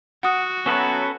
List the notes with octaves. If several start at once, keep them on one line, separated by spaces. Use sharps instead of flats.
F#4 F#5 D#6
F#3 B3 C#4 E4 A4 B4